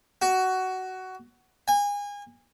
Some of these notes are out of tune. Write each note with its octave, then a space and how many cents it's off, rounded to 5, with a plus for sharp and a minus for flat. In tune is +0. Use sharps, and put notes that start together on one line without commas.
F#4 +15
G#5 -30